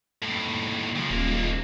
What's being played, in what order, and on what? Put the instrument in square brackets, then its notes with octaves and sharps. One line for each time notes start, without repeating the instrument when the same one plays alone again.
[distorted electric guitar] D#2 A2
C#3 F3
[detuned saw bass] D#1 [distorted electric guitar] G#3 A#3